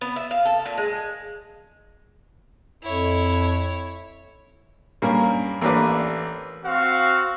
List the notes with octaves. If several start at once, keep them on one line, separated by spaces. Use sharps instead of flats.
B3
E5
F5
A4
A#2
G#3
F2 E4 C#5
G2 A#3 C#4
A1 A#3 D4 B4 D6
C4 F#4 F5